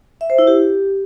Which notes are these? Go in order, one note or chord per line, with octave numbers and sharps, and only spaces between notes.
E5
C5
E4
G4